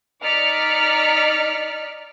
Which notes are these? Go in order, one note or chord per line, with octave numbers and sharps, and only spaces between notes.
D#4 D5 F6 B6 C#7